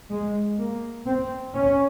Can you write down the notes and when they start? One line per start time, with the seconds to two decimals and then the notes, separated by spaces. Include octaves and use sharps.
0.10 G#3
0.58 A#3
1.06 C4
1.55 C#4